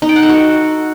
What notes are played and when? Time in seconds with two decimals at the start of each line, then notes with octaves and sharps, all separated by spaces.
0.02 D#4
0.09 G5
0.16 F#5
0.23 A4
0.29 F#4